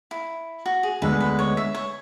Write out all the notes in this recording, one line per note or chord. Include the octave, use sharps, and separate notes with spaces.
E4
F#4
G#4
D2 D3 G#3 B3 B4
B4
C#5
E5
C#5